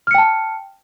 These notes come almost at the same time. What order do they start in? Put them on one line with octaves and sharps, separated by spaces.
F6 C#7 G5 A5